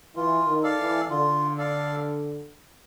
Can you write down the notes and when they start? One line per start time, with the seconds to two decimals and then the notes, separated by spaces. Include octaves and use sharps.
0.15 E3 F4
0.47 D#3
0.63 A4 D5 F5
0.79 E3
1.10 D3 F4
1.58 A4 D5 F5